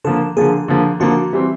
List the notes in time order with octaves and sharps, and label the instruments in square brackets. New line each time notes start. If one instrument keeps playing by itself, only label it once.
[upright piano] D3 F3 A#3 [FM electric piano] A4
[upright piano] D3 F3 A#3 [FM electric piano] G#4
[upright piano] D3 F3 A#3
[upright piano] D3 F3 A#3 [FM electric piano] F#4
[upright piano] E3 G3 C4